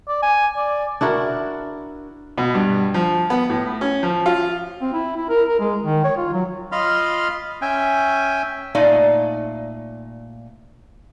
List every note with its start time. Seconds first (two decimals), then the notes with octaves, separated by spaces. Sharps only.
0.08 D5
0.22 G#5
0.57 D5
1.01 D4 E4 F#4 A#4
2.38 B2
2.55 G2
2.94 F3
3.30 B3
3.50 A2
3.81 C#4
4.03 F3
4.26 F4
4.82 C4
4.94 E4
5.17 E4
5.29 A#4
5.48 A#4
5.60 G#3
5.83 D#3
6.04 C#5
6.17 F4
6.33 F#3
6.72 F4 D#5 F5 B5 C6 F6
7.62 C#4 E5 G5 G#5
8.75 A#2 A3 D#4 D5 F5